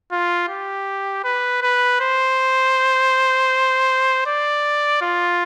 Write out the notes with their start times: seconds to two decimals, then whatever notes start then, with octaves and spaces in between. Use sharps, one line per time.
0.12 F4
0.49 G4
1.24 B4
1.62 B4
2.01 C5
4.27 D5
5.02 F4